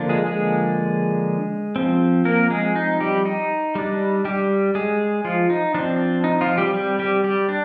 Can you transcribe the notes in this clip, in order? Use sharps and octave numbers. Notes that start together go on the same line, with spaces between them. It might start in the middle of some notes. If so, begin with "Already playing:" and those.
Already playing: D3 F3 A#3 D4
G#3 G#4
G#3 G#4
F3 C4
A#3 A#4
G#3 G#4
D#4
G3 G4
D#4
G3 D4
G3 G4
G#3 G#4
F3 F4
D#4
F3 C4 D4
D#4
F3 F4
G3 G4
G3 G4
G3 G4
G3 G4
D4